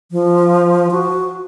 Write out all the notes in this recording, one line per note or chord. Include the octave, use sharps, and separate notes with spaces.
F3
F#4